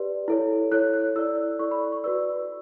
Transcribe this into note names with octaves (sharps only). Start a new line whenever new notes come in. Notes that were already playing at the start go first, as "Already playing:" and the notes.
Already playing: G4 B4 D5
E4 A4 C#5
E4 A4 C#5 F#6
F#6
E4 A4 D5 E6
E4 A4 D5 C#6
B5
B5
C#6
F#4 B4 D5 E6